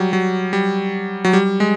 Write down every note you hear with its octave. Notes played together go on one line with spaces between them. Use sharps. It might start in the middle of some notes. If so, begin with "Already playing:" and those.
Already playing: F#3 G3
F#3
G3
F#3
G3
G#3